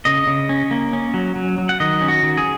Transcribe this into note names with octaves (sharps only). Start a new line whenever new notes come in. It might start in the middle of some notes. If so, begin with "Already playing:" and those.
C#3 D#5
C#3
C#4
A#3
C#4
F#3
F#3
F#3
F#5
D#3 D#5
C#4
F#4
D#3
G#4